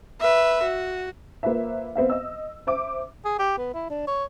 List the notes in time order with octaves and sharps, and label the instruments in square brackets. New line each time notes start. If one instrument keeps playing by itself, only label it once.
[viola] B4 E5
F#4
[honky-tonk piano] A#3 F4 B4 C5 E5
B3 C4 E5 F5
D#5 E6
C5 E5 D6
[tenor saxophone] G#4
G4
B3
E4
D4
C#5